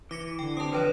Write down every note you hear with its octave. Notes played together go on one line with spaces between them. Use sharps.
E3 D6 A#6 C#7
D3 G5
C4 G4 A5 D#6
E3 F3 D4 B4 C#5